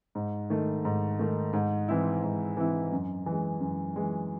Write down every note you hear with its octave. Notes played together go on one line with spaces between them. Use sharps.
G#2
D#3 A3
G#2
D#3 A3
G#2
E3 C4 E4
G#2
E3 C4 E4
F#2
E3 G#3
F#2
E3 G#3